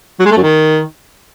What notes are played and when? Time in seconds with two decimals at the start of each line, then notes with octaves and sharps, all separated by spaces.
0.20 F#3
0.25 G#3
0.31 A3
0.37 F#2
0.43 D#3